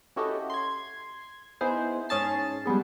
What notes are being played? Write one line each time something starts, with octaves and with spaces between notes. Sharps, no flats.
C#4 E4 F#4 G4 A4 D#5
C6 G#6
B3 D#4 E4 G#4 C5
G#2 C#4 G#4 A5 C7
G3 G#3 B3 G#4